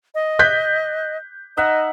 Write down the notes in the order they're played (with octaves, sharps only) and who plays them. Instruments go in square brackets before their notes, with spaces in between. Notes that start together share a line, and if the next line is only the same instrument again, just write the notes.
[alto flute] D#5
[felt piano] F#6 G6 B6
[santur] D#4 E5 F#5 [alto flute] D#5